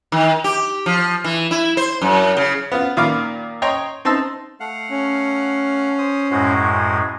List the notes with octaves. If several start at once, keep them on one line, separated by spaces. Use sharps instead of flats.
D#3
G4
F3
E3
E4
C5
F#2
C#3
B3 F4
A#2 D#3 F5 B5 D6
C#5 D#5 G5 A#5 C6
C4 D#4 A5 C6 E6
A3 F5 F#5
C#4
C5 D#6
F#2 A2 G#3 F#4 C5